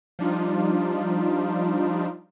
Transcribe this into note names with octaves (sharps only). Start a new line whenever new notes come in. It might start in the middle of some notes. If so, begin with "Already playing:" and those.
F3 G3 D4 D#4 F4